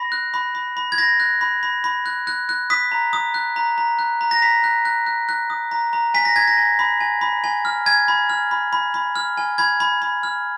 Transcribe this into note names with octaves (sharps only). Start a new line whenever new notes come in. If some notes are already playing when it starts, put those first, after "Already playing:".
Already playing: B5 A#6
F#6
B5
B5
B5
G#6
B5 A#6
F#6
B5
B5
B5
F#6
F#6
F#6
D#6 B6
A#5
D#6
F#6
A#5
A#5
F#6
A#5
A#6
A#5 B6
F#6
F#6
F#6
F#6
D#6
A#5
A#5
G#5 B6
A#6
G#5 G#6
A#6
G#5
B5
G#5
B5
G#5
F6
G#5 G#6
B5
F6
B5
B5
B5
F6
G#5
B5 G#6
B5
B5
F6